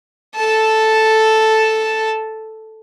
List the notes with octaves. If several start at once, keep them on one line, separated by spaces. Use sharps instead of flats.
A4 A5